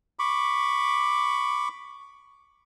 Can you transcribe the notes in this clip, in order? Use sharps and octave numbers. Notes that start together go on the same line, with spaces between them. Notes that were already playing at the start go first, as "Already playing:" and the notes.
B5 C#6 D6